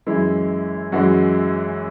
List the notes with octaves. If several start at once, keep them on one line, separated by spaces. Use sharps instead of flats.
F#2 E3 G#3 E4
F#2 E3 G#3 F#4